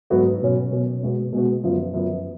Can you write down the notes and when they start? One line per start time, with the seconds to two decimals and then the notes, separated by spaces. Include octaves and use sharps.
0.10 G#2 F#3 B3 F#4 A4
0.42 B2 F#3 C#4
0.72 B2 F#3 C#4
1.03 B2 G#3 B3 F#4
1.32 B2 G#3 B3 F#4
1.64 F#2 F3 B3
1.94 F#2 F3 B3